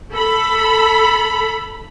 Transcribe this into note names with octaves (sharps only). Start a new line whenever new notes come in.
A4 B5